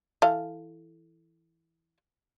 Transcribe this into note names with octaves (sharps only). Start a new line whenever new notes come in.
E3 A4 F5